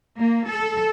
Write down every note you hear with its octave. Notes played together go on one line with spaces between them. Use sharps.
A#3
A4